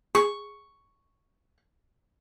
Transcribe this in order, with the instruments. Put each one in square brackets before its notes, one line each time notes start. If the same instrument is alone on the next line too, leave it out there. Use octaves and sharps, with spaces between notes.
[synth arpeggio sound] G#4 [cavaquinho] C#6